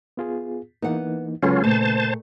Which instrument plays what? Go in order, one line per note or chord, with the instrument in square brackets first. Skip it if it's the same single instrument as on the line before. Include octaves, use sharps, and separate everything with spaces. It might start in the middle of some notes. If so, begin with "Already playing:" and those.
[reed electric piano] B3 F4 G#4
[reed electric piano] E3 A#3 D#4 [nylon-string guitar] B3 F#5
[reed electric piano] C#3 B4 [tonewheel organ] F#3 C#4 F4 [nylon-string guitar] G#3 A4
[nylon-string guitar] A#2 A3 [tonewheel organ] C5 A5